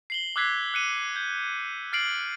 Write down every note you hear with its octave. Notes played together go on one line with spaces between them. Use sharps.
C7 F#7 G7
D6 E6 F#6 G#6 B6 C7
F#6 C#7 D#7
G6
F6 A6 C7 D7 F#7